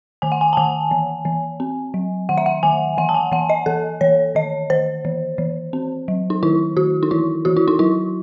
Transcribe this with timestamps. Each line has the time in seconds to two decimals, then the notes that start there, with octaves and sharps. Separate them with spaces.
0.22 D#3 G#5
0.32 F#5
0.41 G#5
0.53 A5
0.57 D#3 G#5
0.91 E3
1.25 E3
1.60 C4
1.94 F#3
2.29 D#3 F#5
2.38 E5
2.46 F#5
2.63 D#3 G#5
2.98 E3 F#5
3.09 A5
3.14 G#5
3.32 E3 F#5
3.50 D#5
3.66 E3 A4
4.01 E3 C#5
4.35 D#3 D#5
4.70 D#3 C5
5.05 E3
5.38 E3
5.73 C4
6.08 F#3
6.30 D#4
6.43 D#3 E4
6.77 D#3 F#4
7.03 D#4
7.11 E3 E4
7.45 E3 F#4
7.57 E4
7.68 D#4
7.79 F#3 E4